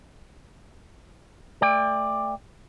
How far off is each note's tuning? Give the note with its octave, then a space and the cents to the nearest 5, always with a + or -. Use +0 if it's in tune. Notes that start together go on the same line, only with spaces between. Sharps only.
A3 +0 D5 +10 G5 +35